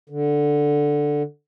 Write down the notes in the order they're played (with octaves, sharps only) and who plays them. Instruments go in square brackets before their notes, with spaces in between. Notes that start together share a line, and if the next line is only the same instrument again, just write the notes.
[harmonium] D3